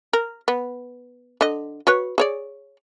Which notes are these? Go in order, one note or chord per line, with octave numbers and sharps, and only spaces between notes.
A#4
B3
D3 D#5
F#4 B4 C#5
G#4 C#5 D5